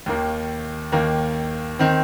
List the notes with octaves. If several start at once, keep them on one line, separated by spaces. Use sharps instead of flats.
D#2 D#3 A#3
D#2 D#3 A#3
D#3 C4